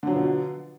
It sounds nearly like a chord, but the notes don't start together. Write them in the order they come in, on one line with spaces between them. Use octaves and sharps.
D3 F#3 F3 B2